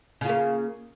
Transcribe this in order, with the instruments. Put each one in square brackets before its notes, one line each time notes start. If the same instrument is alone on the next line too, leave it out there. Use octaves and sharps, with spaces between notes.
[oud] C#3
F4
A#3